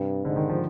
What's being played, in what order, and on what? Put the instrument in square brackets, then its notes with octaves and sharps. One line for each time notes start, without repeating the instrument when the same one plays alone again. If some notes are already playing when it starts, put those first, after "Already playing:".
Already playing: [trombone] G2 [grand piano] C3
[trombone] G#2 [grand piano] D3
[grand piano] D#3
F3